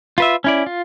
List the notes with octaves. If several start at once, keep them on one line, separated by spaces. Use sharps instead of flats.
F4 B4 E5
C#4 E4 D5
F4